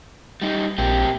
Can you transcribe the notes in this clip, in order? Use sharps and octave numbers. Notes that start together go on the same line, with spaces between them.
G3 D#4
A#1 A#3 C4 G4